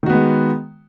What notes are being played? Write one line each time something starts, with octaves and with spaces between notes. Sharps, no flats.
D#3 G#3 B3 F#4